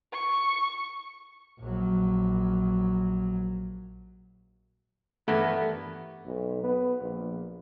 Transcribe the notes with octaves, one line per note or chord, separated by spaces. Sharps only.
C#6
A#1 F#3
G2 E3 A3 B3 A#4
B1
B3
A#1